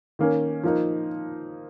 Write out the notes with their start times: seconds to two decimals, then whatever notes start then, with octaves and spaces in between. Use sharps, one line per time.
0.19 D#3 A#3 C#4
0.63 F3 A#3 D#4